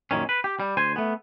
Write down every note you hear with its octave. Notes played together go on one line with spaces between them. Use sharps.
F#2 A#2 D#3 C#4
B4
G4
G3
D2 C5 G#5
A3 B3